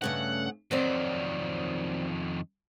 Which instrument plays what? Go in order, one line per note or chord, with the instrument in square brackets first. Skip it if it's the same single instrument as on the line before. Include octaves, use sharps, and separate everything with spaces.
[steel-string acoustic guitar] G2 C#3 A3 [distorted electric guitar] F#5
[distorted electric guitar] F2 D#3 [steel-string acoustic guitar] F#3 C4 D5